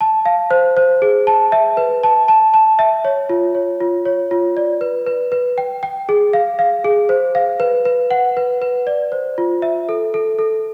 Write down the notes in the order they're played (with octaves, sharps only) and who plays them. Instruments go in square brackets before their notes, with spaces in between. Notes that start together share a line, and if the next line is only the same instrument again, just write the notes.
[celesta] A5
F5
C5
C5
G#4
A5
E5
B4
A5
A5
A5
E5
C#5
F4
C#5
F4
C#5
F4
D5
B4
B4
B4
G5
G5
G#4
F5
F5
G#4
C5
F5
B4
B4
F#5
B4
B4
D5
C5
F4
E5
A4
A4
A4